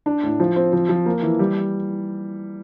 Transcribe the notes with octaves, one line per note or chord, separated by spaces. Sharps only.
D4
A2
F3
C4
F3
F3
A#3
E3
G3